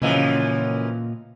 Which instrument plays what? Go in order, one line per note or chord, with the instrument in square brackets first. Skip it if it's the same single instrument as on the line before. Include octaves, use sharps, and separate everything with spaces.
[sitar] F#2 E3 F3 [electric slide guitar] A#2 D#5 F5 [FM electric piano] C#3 C#4